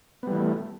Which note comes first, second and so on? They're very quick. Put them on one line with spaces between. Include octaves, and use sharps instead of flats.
B3 G3 E3 A3